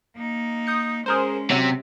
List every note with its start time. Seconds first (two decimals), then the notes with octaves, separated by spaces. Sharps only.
0.15 A#3 D#4
0.67 D#6 G6 C#7
1.06 G#3 C#4 G#4 A#4 C5
1.50 C3 F#3